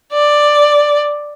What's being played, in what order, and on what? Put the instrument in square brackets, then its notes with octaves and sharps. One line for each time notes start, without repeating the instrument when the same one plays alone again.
[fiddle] D5